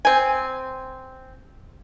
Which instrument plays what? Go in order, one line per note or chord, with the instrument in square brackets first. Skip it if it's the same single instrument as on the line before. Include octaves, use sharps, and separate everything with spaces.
[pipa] C4 G#5